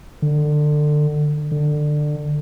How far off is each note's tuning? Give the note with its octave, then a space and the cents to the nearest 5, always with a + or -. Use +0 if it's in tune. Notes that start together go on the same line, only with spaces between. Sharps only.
D3 +25
D3 +20